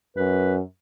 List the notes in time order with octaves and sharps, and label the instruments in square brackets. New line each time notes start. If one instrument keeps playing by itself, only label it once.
[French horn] F#2 [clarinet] B4